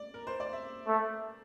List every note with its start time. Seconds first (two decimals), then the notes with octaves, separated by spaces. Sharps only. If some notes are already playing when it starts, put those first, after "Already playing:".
Already playing: D5
0.14 A#4
0.27 C5
0.40 D5
0.53 E5
0.87 A3